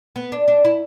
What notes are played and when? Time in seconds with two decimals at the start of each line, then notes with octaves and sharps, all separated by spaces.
0.16 B3
0.32 D4
0.48 D4
0.65 E4